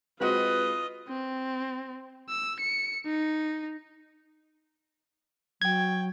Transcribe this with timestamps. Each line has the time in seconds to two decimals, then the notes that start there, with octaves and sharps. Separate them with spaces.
0.21 G#3 C4 F4 F#4 B4 D#5
1.08 C4
2.29 E6
2.60 C#7
3.06 D#4
5.62 F#3 G5 G#6